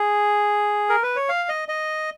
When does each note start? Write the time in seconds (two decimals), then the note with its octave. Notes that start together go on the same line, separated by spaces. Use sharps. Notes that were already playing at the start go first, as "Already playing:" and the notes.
Already playing: G#4
0.89 A#4
1.03 B4
1.16 C#5
1.29 F5
1.49 D#5
1.68 D#5